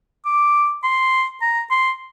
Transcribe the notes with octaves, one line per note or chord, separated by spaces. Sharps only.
D6
C6
A#5
C6